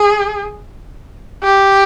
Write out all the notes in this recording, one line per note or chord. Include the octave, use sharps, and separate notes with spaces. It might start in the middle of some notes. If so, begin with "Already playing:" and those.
Already playing: G#4
G4